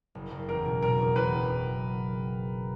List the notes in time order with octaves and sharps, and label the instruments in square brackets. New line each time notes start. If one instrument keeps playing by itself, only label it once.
[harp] F#1
F#1
[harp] E2 [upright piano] A#4
[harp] B2
[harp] B2 [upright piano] A#4
[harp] E2
[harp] E2 [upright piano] B4
[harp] F#1